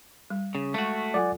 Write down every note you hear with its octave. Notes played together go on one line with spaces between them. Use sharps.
G3
C#3
G#3 A3 F#4
F#3 F4 A4 D5 F#5 G#5